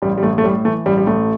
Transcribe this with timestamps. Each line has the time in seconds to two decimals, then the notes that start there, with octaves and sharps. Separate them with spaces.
0.02 A1 G3
0.18 G3
0.23 A1 A3
0.38 A3
0.44 A2 G3
0.65 E3 A3
0.86 A1 G3
0.98 G3
1.07 A1 A3